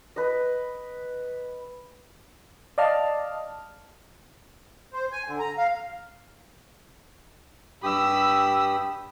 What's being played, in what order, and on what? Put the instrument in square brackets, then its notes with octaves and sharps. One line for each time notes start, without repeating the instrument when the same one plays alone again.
[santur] B4 D#5
[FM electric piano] D5 D#5 F5 A5 F6
[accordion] C5
G#5
D3
A#5
F5
[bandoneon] G2 G4 D#6 [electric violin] B5 E6